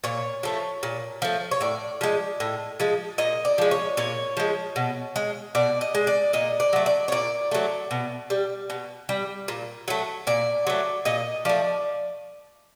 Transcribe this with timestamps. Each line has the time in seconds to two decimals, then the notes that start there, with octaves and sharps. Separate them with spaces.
0.04 A#2 C#5
0.43 F3 A3
0.83 A#2
1.22 F3 A3
1.51 C#5
1.61 A2 D5
2.01 F3 G#3
2.40 A2
2.80 F3 G#3
3.18 A#2 D#5
3.45 D5
3.58 F3 G#3
3.71 C#5
3.97 A#2 C#5
4.37 F3 G#3
4.76 B2
5.16 G#3
5.55 B2 D5
5.81 D#5
5.95 G#3
6.07 D5
6.33 A#2 D#5
6.60 D5
6.73 F#3 A3
6.86 D5
7.08 C#5
7.12 A#2 D5
7.51 F#3 A3
7.91 B2
8.30 G3
8.70 B2
9.09 G3
9.48 A#2
9.88 F#3 A3
10.27 A#2 D5
10.67 F#3 A3
11.05 A#2 D#5
11.45 F3 A3 D5